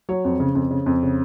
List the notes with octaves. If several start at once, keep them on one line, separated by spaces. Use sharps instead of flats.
F#3 C#5
F2
C#3
F2
C#3
F2
C#3